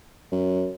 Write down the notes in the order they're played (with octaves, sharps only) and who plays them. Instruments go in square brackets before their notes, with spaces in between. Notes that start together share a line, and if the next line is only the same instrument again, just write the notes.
[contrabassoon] F#2